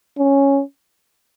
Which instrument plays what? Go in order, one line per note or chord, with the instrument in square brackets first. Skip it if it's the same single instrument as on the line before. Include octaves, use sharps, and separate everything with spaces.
[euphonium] C#4